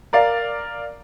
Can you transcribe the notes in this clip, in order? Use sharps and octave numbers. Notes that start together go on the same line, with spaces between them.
A#4 D5 F5